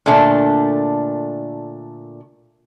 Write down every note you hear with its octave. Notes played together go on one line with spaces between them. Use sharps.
A#2 D3 A3 D4